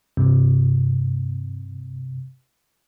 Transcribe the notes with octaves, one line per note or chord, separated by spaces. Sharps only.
G2 C3